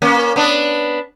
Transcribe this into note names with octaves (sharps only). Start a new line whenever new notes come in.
A#3 C#4
B3 D4